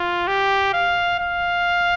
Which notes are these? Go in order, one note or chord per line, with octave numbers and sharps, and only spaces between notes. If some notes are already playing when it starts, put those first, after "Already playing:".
Already playing: F4
G4
F5
F5